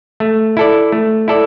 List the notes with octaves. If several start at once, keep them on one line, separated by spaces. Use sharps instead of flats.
A3
E4 A4 D5
A3
E4 A4 D5